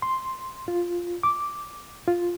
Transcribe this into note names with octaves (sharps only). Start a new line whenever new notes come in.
C6
F4
D6
F4